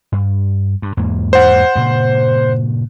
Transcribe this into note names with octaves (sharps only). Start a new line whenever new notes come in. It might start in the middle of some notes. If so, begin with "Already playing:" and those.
G2
G2
E2 G#2 A#3
C5 F#5
G2 A#2 C#3